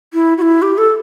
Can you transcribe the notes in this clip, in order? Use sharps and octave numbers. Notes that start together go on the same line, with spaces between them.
E4
F#4
E4
G4
A4